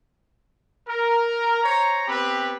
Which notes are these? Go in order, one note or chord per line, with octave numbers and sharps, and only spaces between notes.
A#4
C5 C#5 A#5
B3 C4 G4 B4 B5